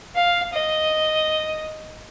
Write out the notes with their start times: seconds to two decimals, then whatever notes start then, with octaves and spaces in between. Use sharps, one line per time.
0.15 F5
0.53 D#5